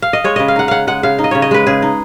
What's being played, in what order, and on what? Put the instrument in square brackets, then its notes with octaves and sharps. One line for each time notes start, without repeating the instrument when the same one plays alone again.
[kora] F5
D#5
G#3 C#5
C#3 D#5
F5
D#4 F#5
C#3 F5 F#5
G#3 F#5
C#3 F5
D#4
D#5
C#3 C#5
D#5
G#3 B4
C#3 G#4
D#4